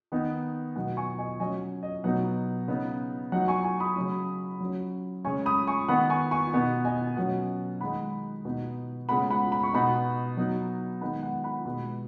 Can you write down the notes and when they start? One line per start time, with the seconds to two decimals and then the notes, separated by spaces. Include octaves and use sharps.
0.12 D#3 B3 D#4
0.76 B2 F#3 D#4 F#5
0.97 G#5 C#6
1.18 D#5 G#5
1.40 F#3 C#4 D#5 G#5
1.83 D#5
2.04 B2 F#3 B3 D#4 F#5
2.68 C#3 B3 D#4
3.32 F#3 D#4 F#5
3.48 G#5 C#6
3.64 G#5 C#6
3.80 B5 D#6
3.96 C#3 F#3 C#4
4.60 F#3 C#4
5.25 C#3 G#3 C#4 G#5 C#6
5.46 B5 D#6
5.67 G#5 C#6
5.88 D#3 B3 D#4 F#5 B5
6.10 G#5 C#6
6.31 G#5 C#6
6.53 B2 B3 D#4
6.85 D#5 G#5
7.17 B2 F#3 C#4 F#5
7.80 D#3 G#3 D#4 F#5 B5
8.45 B2 B3 D#4
9.09 C#3 G#3 B3 F#5 B5
9.30 F#5 B5
9.52 B5
9.63 C#6
9.73 B2 B3 D#4 F#5 B5
10.37 F#3 B3 D#4
11.01 D#3 G#3 B3 D#4 F#5 B5
11.23 F#5
11.44 F#5 B5
11.65 B2 G#3 D#4